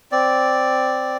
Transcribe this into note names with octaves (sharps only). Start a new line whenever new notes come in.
C4 D5